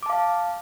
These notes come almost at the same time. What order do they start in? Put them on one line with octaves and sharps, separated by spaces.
D6 A5 F5